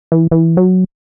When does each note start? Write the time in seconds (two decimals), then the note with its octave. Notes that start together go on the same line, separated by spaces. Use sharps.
0.12 E3
0.31 E3
0.57 F#3